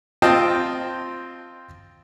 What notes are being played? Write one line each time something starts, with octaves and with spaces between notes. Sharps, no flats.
C4 F4 D#5 G5 A5